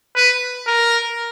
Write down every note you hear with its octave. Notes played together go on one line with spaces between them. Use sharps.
B4
A#4